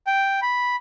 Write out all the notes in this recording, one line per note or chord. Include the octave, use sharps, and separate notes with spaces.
G5
B5